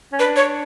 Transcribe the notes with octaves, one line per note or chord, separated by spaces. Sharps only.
C#4
D4 B4
C#5